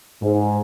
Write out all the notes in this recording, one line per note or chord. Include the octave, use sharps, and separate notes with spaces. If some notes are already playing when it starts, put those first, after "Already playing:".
G#2